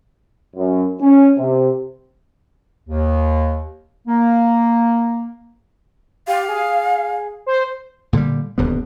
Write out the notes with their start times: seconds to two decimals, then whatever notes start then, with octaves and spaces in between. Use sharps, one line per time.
0.56 F#2
1.00 C#4
1.38 C3
2.89 D#2
4.07 A#3
6.27 G4 F5
6.49 G#4
7.46 C5
8.13 A#2 D3 E3 G3
8.58 D#1 D2 G2 B3